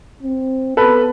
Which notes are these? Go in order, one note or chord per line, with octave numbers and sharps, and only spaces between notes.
C4
B3 A4 B4